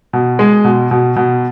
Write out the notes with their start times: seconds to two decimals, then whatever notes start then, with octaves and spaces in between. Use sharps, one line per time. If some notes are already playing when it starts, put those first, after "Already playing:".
0.13 B2
0.39 G#3
0.64 B2
0.91 B2
1.16 B2